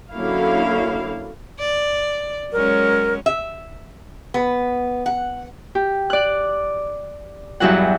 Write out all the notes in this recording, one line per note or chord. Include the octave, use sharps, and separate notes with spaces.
D3 F#3 A#3 C#4 E4 F5
D5
F#3 G#3 C#4 A#4
E5
B3
F#5
G4
D5 F#6
E2 G2 E3 F#3 F#5